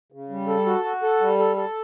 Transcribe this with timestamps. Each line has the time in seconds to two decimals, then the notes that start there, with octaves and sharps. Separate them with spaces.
0.12 C#3
0.29 G3
0.47 A4
0.66 F#4
0.84 F#4
1.02 A4
1.20 G3
1.38 A4
1.56 A4